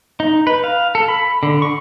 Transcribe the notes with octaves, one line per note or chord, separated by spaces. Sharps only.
D#4
B4
F5
A4
B5
D3
C#6